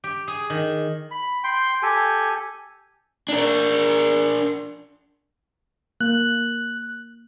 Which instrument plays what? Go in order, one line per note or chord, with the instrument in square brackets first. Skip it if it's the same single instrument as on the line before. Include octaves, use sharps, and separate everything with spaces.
[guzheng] G4
G#4
D#3
[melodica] B5
G5 C6
G4 A4 G#5
[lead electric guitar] D4 A#4
[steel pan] A#3 [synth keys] F#6